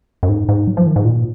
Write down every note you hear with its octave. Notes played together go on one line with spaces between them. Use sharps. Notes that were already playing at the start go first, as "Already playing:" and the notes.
F#2
G#2
G#2
F#3
F3
D#3
G#2
A#2